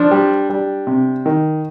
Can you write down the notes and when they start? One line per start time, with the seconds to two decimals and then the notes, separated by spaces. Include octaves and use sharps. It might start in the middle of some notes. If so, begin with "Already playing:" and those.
Already playing: F3 D4
0.11 G3
0.50 G3
0.87 C3
1.26 D#3